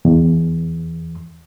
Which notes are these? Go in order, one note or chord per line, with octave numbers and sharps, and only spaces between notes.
E2